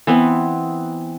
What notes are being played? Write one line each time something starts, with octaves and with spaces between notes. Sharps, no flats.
E3 B3 C4